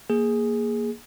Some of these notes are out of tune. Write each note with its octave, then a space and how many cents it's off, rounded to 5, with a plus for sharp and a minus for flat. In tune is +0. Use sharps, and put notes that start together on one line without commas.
A#3 +0 G#4 +0